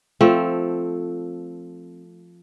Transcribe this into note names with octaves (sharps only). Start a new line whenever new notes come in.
F3 A3 C4